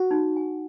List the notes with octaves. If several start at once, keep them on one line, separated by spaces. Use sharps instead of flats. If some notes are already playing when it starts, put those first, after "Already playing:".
Already playing: F#4
D#4
G#5